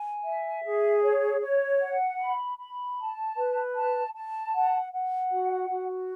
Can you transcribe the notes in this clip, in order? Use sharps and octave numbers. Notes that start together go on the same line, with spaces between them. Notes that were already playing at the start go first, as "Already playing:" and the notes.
Already playing: G#5
E5
G#4
C#5
C#5
F#5
B5
B5
A5
B4
A5
A5
F#5
F#5
F#4
F#4